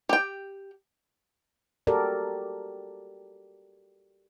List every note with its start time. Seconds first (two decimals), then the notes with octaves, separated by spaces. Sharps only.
0.09 G4 G5
1.87 F#4 G4 A4 A#4 D5